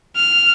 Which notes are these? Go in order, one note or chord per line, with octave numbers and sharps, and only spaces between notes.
F6